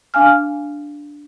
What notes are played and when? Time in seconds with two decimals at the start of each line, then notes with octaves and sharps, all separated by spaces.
0.14 D4 F5 G#5 F6